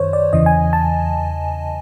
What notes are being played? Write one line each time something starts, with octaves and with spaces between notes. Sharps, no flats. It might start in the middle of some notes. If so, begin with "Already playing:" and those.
Already playing: F#2 D#3 C5 C#5
D5
E2 C#3 E3 D#5
G#5
A5